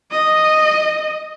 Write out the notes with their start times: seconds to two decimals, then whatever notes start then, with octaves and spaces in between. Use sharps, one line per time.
0.11 D#5